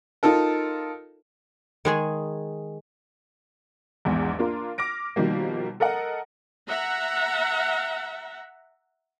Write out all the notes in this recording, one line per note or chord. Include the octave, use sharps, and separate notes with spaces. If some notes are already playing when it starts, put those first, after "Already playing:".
D#4 F4 A4 A#4
D#3 G#3 G#4
A#1 E2 G#2
A#3 D4 F4 A#4
D6 F6 A#6 D7
B2 D#3 F3 G3 A#3
A4 A#4 D#5 F#5
E5 F#5 A#5